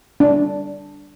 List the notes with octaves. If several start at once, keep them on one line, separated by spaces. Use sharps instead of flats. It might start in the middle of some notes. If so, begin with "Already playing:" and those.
D4